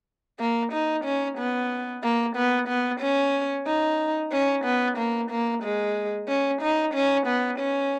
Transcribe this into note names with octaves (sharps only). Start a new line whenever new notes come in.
A#3
D#4
C#4
B3
A#3
B3
B3
C#4
D#4
C#4
B3
A#3
A#3
G#3
C#4
D#4
C#4
B3
C#4